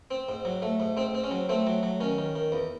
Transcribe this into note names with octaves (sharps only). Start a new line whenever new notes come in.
C4
G#2
F#3
A3
G#2
G#2 C4
C4
C#4
F#3
A3 C4
F#3
F#3
D#3 C#4
D#3
D#3
E2